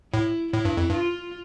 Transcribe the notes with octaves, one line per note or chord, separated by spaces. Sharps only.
A2 E4
A2 E4
G2
F2
G2 F4